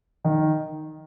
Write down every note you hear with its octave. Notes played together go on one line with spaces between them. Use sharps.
D#3